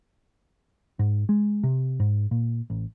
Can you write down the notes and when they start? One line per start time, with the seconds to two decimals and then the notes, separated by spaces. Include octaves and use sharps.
0.99 G#2
1.29 G#3
1.63 C3
2.00 G#2
2.31 A#2
2.70 A1